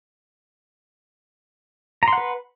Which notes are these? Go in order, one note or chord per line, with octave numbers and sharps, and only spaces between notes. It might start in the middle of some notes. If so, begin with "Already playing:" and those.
B4 F#5 A#5 C6